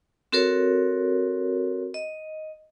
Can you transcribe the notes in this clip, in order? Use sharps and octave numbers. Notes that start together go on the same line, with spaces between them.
C4 F#4 A4 A#4 C#5
D#5